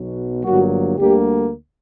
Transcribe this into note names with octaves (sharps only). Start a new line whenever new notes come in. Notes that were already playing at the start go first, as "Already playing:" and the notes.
Already playing: B1 B2 F#3
G1 G2 F#3 A#3 F#4
D2 D3 G3 A#3 G4